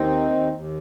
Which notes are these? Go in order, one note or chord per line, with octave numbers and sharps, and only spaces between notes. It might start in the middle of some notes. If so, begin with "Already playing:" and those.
Already playing: D#2 C4 D#4
D#3
D#2
D#2